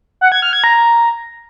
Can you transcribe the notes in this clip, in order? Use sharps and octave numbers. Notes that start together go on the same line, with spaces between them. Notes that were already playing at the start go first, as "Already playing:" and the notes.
F#5
G#6
F6
G#6
A#5